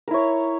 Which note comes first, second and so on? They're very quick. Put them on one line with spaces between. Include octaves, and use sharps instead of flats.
A#4 E4 C#5